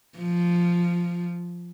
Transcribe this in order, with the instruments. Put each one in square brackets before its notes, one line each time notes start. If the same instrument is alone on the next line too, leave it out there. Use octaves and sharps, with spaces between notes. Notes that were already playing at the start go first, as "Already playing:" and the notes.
[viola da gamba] F3